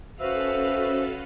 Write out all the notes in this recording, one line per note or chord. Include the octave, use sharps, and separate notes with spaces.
C#4 F#4 A4 B4 C5 E5 F5